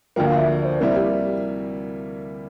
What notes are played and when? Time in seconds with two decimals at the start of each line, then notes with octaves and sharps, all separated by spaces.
0.16 D2 D3 F3 A#3 G5
0.27 F5
0.37 E5
0.58 D5
0.65 C5
0.80 C3 G3 A#3 E4 A#4
0.96 G4